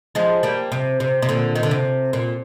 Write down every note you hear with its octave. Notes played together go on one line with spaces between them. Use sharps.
F3 G#3
G3 A#3
C3
C3
C3
A#2 D3
D#3
D3
C3
A#2